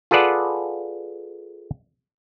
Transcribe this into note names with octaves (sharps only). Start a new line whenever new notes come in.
F4 G#4 A4 B4 D5 F#5